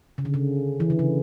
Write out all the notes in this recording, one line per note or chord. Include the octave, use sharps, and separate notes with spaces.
C#3
D3
C#3
E3
D3
C#3